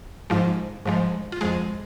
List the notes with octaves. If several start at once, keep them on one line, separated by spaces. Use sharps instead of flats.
G#2 F3 G#3
G#2 F3 G#3
F4
F2 F3 G#3 G#4